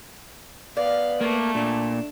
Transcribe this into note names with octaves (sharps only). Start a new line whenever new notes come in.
B3 D5 F5
A3 A#3
A#2 D4